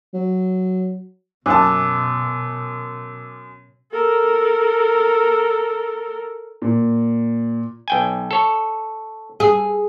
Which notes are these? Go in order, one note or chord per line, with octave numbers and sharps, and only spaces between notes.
F#3
F#2 B2 A5 D6 E6 F#6
A4 A#4
A#2
B1 G5 G#5
A4 C#5
G#4